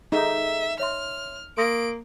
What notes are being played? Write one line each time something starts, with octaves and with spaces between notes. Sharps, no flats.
D#4 G#4 A4 E5
C#5 E5 C6 F6
A#3 C6 D#6 A#6 D7